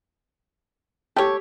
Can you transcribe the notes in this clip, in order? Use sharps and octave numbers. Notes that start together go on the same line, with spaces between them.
G4 A4 C#5